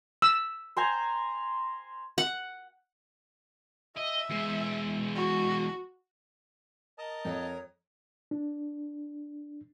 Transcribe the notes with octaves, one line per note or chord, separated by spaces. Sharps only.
E6
C5 G#5 A#5
F#5
D#5 E5
E2 G#3
F#4
A#4 D#5 A5 D#6
F2 C#5
D4